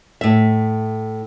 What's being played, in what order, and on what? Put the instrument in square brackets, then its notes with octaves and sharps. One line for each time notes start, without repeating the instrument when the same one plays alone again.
[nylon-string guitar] A2 E5